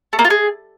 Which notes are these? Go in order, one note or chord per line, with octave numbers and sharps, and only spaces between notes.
A3
A#3
F4
G#4